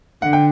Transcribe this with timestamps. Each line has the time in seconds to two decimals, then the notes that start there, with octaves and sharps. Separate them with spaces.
0.22 D3 F#5
0.33 G5